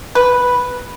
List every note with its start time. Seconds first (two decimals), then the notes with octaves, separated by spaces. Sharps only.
0.15 B4